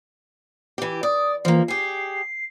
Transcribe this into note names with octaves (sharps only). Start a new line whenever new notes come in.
E3 G4
D5 D#6
E3 F3 A#3
G4 G#4 C7